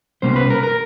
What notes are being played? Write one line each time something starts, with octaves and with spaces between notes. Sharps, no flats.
C2 B2 G3 A#3 C#4 C5
B4
A#4
A#4